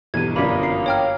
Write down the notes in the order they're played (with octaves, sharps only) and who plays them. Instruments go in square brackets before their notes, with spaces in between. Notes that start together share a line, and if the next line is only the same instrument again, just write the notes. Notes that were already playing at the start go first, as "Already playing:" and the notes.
[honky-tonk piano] B1 E2 G2 [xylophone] G#6 D#7
[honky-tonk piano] G1 F#2 D4 [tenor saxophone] A#3 [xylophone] B5 B6
[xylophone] C7
C#5 G5 F6